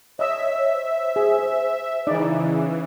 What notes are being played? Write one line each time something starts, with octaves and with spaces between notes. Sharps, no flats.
C#5 D#5 E5 E6
C5
G#4
C#3 E3 D#4 D5